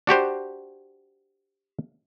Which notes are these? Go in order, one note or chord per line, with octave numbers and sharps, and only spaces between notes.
D4 F#4 G4 C5